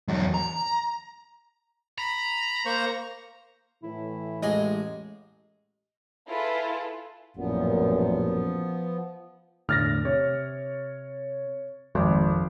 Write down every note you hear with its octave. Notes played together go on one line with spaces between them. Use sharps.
E2 F#3
A#5
A#5 B5
A#3 C5 C#6
A2 E3 E4
A1 G#3 G#4 D#5
E4 F4 G#4 A4 B4 A5
A1 F#2 A#2 F3 B3
E1 A2 D3 F6 A6 A#6
C3 C#5
G#1 F2